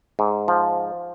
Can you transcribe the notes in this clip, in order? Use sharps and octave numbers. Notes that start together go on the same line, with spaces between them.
G#2
F3